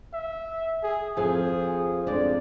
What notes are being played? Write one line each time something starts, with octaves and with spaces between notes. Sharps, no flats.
E5
G#4
F2 F3 G#4
F2 G#3 D4 D5